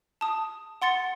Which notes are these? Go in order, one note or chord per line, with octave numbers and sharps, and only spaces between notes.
A5 D#6
F#5 C6 A6 C#7